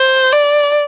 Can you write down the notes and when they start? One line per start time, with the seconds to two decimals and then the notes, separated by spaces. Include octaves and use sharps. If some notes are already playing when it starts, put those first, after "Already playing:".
Already playing: C5
0.33 D5